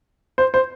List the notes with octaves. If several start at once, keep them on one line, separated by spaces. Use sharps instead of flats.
C5
C5